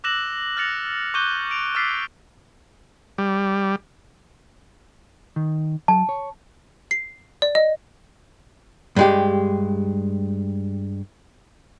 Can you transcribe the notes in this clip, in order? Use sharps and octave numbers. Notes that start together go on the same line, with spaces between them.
D6 E6 F#6 A#6 E7 F#7
F6 F#6 A6 A#6 C#7 F7
C#6 D6 F#6 G6 D#7 G7
D7 F7
D6 E6 F6 A6 B6 C7
G3
D#3
F#3 A5
C#5
C7
D5
D#5
G2 G#3 G4